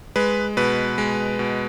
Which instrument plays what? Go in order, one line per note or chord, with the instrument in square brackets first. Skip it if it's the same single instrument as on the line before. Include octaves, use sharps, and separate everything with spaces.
[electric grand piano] G#3 B4
B2 B4
G#3
B2